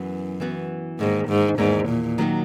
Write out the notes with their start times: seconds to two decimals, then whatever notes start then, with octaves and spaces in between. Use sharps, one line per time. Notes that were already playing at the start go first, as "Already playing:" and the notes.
Already playing: F#2 E3 B3 F#4
0.40 E3 B3 F#4
0.99 E2 G#2 D#3 A#3
1.28 G#2
1.58 E2 G#2 D#3 A#3
1.89 A#2
2.18 D#3 F#3 A#3 D#4 F#4